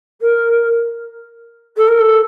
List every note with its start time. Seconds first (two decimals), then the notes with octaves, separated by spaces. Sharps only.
0.21 A#4
1.77 A4
1.88 A#4
2.00 A4